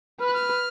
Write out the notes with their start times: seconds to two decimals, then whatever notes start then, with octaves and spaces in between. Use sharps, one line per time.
0.20 B4 F6
0.27 F#6
0.34 F6